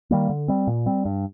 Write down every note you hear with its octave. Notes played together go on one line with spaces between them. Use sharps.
D#3 G3 A#3
D3
G3 C4
A#2
G3 C4
G2